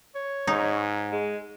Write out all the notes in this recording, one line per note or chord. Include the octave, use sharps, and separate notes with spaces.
C#5
G#2 D#4
G#3